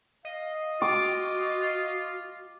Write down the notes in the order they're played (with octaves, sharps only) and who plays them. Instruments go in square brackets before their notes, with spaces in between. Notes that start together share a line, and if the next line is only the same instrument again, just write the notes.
[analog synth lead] D#5 [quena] F5
[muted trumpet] F4 [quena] F#4 [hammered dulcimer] D6